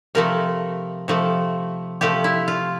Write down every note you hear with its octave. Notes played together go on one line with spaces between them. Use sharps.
C3 F3 A3 A#4
C3 F3 A3
C3 F3 A3 G4
E4
F4